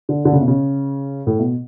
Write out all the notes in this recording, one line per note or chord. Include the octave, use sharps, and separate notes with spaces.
D3
D3
C#3
B2
C#3
A2
B2